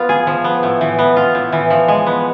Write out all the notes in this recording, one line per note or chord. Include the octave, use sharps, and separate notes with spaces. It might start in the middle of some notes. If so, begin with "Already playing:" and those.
Already playing: F3 B3 F4
G#4
F3
B3
A2
E3
B3
F4
A2
E3
F3
G#3
B3